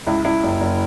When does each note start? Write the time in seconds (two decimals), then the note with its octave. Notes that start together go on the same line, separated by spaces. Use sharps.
0.07 C#2 E4
0.25 C#2 E4
0.43 F#1
0.61 F#1